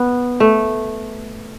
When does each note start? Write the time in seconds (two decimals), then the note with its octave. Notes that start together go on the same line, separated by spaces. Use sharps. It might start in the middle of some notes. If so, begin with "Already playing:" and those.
Already playing: B3
0.40 A3